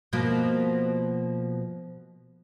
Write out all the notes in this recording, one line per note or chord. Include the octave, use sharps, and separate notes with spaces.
B2 F3 A#3